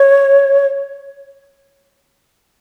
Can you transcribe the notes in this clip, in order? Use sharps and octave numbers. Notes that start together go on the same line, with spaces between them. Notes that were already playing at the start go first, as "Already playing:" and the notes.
Already playing: C#5